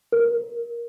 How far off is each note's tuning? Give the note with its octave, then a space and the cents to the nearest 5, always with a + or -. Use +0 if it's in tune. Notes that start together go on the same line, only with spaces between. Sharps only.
A#4 +10